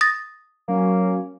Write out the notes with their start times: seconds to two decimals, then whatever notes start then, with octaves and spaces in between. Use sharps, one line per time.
0.01 D#6 A6 A#6
0.68 F#3 A#3 C#4